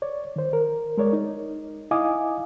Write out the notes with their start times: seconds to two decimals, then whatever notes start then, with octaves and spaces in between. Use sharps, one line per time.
0.02 C#5 D5
0.36 D#3 C5
0.53 A#4
0.97 G#3 A#4 C#5 D5
1.13 D#4
1.91 E4 D#5 F5 G#5 D6 D#6